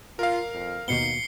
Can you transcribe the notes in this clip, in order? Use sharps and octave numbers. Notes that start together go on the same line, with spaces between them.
F4 A#4 F5
F2
D#2 B2 B3 D#4 C7 C#7 G7